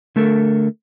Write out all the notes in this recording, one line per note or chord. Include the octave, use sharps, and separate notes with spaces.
D3 A3 A4 A#4